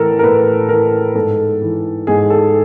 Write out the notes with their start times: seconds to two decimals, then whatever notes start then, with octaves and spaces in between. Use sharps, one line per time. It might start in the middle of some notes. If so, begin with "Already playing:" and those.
Already playing: A2 E3 A4 A#4
0.19 A#4
0.23 A2 B4
0.69 E3 A#4
1.15 G#2 A4
1.62 E3
2.07 G#2 G#4
2.30 A4